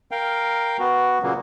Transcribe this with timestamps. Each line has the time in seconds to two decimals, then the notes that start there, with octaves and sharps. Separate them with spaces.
0.11 A#4 F5 G5
0.79 B3 F#4
1.23 A#2 C#3 F#3 A#3